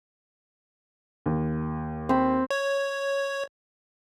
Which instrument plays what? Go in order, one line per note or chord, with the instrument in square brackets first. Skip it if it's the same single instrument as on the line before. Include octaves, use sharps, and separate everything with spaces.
[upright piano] D#2
[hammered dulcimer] C4 B5
[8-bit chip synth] C#5